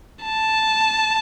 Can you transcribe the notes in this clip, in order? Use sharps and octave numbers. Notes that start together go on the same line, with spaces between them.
A5